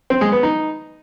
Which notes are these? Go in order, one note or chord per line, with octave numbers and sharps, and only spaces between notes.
C4
G#3
B3
D#4